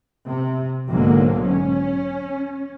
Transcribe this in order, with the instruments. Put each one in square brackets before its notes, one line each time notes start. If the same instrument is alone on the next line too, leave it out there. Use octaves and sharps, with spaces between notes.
[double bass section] C3
B1 G#2 D3 F#3 A#3
C#4